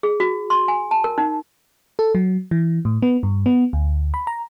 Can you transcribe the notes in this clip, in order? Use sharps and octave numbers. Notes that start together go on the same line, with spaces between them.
G#4
F#4
C6
G#5
A5
A#4
D#4
A4
F#3
E3
A2
B3
G2
B3
D2
B5
A#5